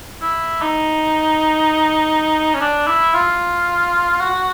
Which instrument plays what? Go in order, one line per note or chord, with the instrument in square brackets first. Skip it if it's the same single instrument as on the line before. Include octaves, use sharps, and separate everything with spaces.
[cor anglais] E4
D#4
C#4
D4
E4
F4
F#4